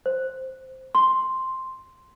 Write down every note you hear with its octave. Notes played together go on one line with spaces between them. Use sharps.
C5
C6